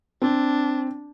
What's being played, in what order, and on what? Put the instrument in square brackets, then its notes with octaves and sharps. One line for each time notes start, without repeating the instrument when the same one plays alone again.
[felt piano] C4 [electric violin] D4